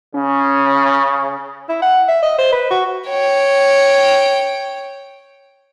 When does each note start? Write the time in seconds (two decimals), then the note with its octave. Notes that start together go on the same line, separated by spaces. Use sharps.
0.15 C#3 C#4
1.69 E4
1.82 F#5
2.08 E5
2.23 D#5
2.38 C5
2.52 B4
2.71 F#4
3.09 C#5 G5